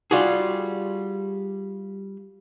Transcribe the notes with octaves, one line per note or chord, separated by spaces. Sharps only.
G3 F4 F#4 G#4